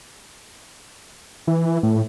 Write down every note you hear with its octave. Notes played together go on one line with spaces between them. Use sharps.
E3
A2